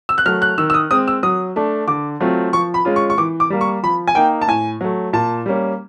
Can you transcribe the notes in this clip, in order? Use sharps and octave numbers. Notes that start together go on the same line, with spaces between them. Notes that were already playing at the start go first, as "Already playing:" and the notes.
E6
F#6
F#3 A3 F6
F#6
D#3 E6
E6
D#6
G#3 C4 D#6
E6
F#3 D#6
A3 D4
D3 D6
F#3 A3 C4 F4
F3 C#6
B5
G#3 C#4 F4
C#6
C#6
E3 D6
D6
G3 A#3
C#6
F3 B5
G#5
A#3 D#4 G5
A5
A2 G#5
F#3 A3
A#2 A5
G3 A#3 C#4